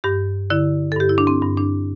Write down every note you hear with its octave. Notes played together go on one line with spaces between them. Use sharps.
G2 G4
D3 E4
A4
G2 G4
E4
D4
C4
G2
D4